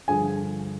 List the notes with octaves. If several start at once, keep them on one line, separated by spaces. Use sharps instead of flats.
G2 D3 F3 G#4 G#5